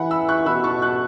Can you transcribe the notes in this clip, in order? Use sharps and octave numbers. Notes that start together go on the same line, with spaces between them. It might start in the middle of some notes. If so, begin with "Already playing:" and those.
Already playing: E3 E5 F#5 B5
B5 E6
C#6 F#6
B2 B5 E6
A5 C#6
C#6 F#6